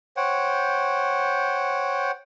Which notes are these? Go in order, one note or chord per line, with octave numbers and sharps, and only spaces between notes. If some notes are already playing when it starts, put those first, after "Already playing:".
C5 C#5 F#5 G5